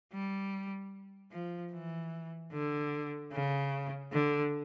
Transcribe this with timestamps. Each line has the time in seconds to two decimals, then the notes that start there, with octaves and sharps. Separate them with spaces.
0.13 G3
1.33 F3
1.73 E3
2.52 D3
3.33 C#3
4.13 D3